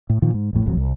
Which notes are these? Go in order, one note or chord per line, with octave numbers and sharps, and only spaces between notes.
A2
A#2 D#3 F3
G#2
A1 F2 A2
E1 A1 F2 F#3
C2